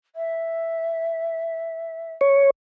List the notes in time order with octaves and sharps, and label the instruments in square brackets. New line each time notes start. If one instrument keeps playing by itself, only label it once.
[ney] E5
[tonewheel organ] C#5